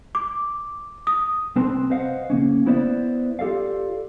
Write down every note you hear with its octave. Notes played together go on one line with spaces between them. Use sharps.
D6
D#6
C2 C4 B4 A5 C6
B4 C5 D#5 F5 F#5
C#3 A#3 C#4
B3 E4 B4 C5 D5 E5
F4 G4 A4 D5 F5